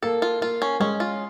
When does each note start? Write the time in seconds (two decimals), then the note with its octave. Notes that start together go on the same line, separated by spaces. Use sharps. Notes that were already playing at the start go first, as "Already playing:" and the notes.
0.02 A#3 A4
0.22 F4
0.41 A#3 F4
0.62 C#4
0.80 G#3 C#4
1.00 F4